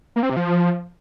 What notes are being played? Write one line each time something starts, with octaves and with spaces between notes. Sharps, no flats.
A#3
C4
C3
F3